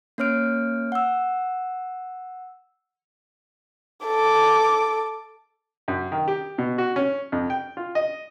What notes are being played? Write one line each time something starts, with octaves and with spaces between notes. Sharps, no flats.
A#3 C#4 C#5 F6 D7
F#5 E6
A4 D6
F#2
D#3
G4
B2
F#4
C#4
F2
G5
F4
D#5